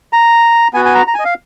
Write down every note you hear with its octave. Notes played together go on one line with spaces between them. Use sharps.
A#5
B3 F#4 G#5
G#5
A#5
A#5
G#5
D#5
F5